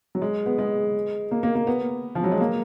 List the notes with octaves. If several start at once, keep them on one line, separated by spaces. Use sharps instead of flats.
F#3
G#3
B3
G#3
A#3
A#3
A#3
B3
F3
F#3
G#3
A#3